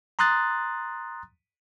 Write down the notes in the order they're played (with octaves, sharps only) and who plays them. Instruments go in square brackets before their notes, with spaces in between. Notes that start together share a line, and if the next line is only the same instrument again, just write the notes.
[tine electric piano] A#5 C6 D#6 F#6 A6